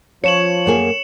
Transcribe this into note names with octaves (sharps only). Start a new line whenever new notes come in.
F3 C#5 C#7 E7 F#7
F#2 A#3 G#4